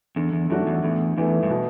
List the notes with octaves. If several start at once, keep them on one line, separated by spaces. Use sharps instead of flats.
E2 D3
E2
F#2 A3 D4 F#4
E2
E2 A2
E2 E3 A3
G2
B2